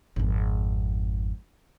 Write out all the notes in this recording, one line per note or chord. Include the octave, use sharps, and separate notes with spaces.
G#1 F2